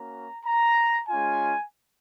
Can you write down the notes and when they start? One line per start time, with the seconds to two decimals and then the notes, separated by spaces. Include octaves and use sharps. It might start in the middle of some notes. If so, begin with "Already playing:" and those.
Already playing: A#3 C#4 F#4 A#5
0.46 A#5
1.09 G#3 C#4 F4 G#5